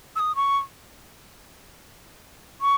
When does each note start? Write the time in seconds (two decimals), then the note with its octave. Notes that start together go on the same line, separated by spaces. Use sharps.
0.16 E6
0.20 D#6
0.36 C#6
2.61 C#6